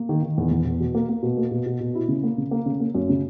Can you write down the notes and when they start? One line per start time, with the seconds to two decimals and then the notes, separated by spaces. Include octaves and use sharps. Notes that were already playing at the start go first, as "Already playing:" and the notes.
Already playing: A#3
0.09 D#3
0.23 D#3
0.38 E2
0.51 E2
0.66 E2
0.80 B2
0.95 A#3
1.09 A#3
1.23 B2
1.37 A#3
1.51 B2
1.66 B2
1.80 B2
1.95 E4
2.08 C#3
2.23 A#3
2.38 C#3
2.51 A#3
2.66 C#3
2.80 A#3
2.95 F#2
3.09 C#3